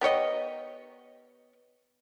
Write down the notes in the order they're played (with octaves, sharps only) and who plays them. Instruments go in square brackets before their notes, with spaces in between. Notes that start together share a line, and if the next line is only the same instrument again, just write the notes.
[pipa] B3 G4 C#5 D#5